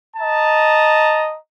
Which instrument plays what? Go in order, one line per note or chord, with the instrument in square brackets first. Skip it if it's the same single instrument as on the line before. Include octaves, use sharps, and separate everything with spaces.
[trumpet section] D#5 A5 A#5